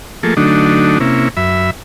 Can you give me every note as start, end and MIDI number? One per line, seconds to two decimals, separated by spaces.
0.23 0.34 53
0.23 0.34 57
0.23 0.34 58
0.23 0.34 68
0.23 0.34 69
0.37 0.98 50
0.37 0.98 54
0.37 0.98 57
0.37 0.98 62
0.37 0.98 63
1.00 1.29 48
1.00 1.29 58
1.00 1.29 61
1.00 1.29 64
1.37 1.71 42
1.37 1.71 76
1.37 1.71 83